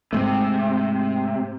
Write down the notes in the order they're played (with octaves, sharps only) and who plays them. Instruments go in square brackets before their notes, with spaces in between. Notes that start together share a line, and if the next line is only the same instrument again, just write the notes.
[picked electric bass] G#2 G#3 A3 [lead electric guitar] C3